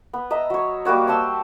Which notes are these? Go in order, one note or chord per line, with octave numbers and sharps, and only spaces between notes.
B3
D#5 E5 A#5
F#3 C#5
G3 A#3 F#4 C#5
C5 A5 C6 E6